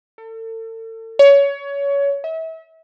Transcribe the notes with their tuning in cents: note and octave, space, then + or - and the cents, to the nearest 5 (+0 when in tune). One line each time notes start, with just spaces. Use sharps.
A4 +35
C#5 +20
E5 -35